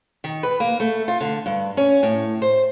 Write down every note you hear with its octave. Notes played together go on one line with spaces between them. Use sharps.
D#3
B4
A#3
A3
F4
D3
G2
C#4
A2
C5